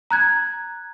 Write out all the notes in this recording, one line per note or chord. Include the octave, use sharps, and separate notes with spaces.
A#5 F#6 G#6